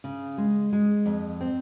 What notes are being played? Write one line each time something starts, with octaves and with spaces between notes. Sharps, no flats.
C#3
G#3
G#3
F2
C4